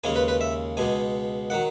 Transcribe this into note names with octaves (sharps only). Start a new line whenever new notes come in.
D#2 C#3 G#3 C#4 G#5
B4
B4
E5
C#2 B2 G#3 G#5
D#3 F#3 F#5